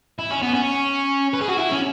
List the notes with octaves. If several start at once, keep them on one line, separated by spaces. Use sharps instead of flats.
E4
C#4
B3
C#4
B4
G#4
F#4
E4
C#4